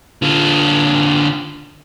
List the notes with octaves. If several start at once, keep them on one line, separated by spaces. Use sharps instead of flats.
D3 F4